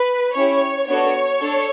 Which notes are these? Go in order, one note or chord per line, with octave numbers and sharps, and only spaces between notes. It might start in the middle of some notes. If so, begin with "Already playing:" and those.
Already playing: B4
C#4 E4 G4 C#5
B3 D4 F#4 A4 C#5
D4 A4